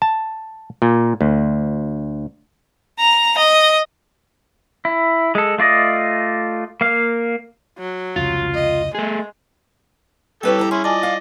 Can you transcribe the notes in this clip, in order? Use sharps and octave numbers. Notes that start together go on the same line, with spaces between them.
A5
A#2
D2
A#5
D#5
E4
G#3 A4
A3 F4 D5 D#5
A#3 F5
F#3
F1 C#2 F4
D#5
G#3 A3 G#4
G3 C4 E4 G4 A4 B4 C#5
F2 E4 A#5
C#4 E4 G#4 C6
F4 D5 D#5 G#5 A5
F5